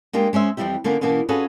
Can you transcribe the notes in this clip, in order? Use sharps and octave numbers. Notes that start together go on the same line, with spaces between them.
G#3 A#3 D4 G4
G#3 C#4 C5 E5
F2 E3 F3 G3 E4 G4
D3 A#3 B3 C#4
B2 E3 A#3 B3 C#4
C#4 F4 F#4 G#4 A4 B4